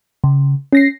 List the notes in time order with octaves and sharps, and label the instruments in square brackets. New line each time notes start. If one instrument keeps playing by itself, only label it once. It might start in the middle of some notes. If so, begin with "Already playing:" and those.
[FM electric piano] C#3
C#4 A#6 C7